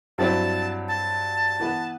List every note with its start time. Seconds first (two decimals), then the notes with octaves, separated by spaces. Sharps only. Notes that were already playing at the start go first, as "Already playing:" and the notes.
0.18 G2 F#3 C4 E4 A5
0.88 A5
1.60 E3 B3 E4 B4